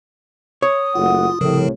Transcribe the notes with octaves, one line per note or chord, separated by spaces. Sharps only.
C#5 D#6
F#1 A3 F4 F#5
C2 A2 C#3 F3 A#4